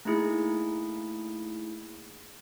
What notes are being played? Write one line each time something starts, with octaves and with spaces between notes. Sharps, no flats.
A3 A#3 D#4 E4 G#4